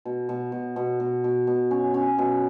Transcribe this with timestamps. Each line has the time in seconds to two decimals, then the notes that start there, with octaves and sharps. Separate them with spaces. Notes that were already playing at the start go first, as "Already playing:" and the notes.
0.05 B2
0.29 B2
0.52 B2
0.76 B2
1.00 B2
1.24 B2
1.47 B2
1.71 C#4
1.94 C#4
2.18 B2